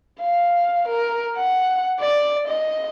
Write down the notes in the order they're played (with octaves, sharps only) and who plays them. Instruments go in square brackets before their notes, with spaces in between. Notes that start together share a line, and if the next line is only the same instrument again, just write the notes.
[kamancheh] F5
A#4
F#5
D5
D#5